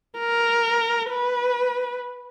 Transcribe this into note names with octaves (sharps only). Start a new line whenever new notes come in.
A#4
B4